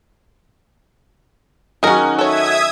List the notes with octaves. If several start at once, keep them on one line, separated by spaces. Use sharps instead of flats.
D#3 F#3 C#4 D#4 F#4 G#4 A#4
A4 C#5 E5 D#6 G#6